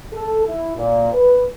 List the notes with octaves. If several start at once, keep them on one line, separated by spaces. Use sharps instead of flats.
A4
E4
A#2
B4